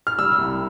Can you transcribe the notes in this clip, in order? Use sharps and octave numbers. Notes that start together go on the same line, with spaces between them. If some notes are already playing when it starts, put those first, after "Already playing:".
F6
G3 E6
C2